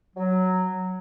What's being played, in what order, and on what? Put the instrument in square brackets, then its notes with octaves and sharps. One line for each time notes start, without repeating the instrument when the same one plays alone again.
[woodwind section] F#3